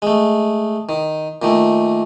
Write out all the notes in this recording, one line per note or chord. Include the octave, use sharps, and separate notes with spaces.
G#3 A3
D#3
A#2 D#3 A3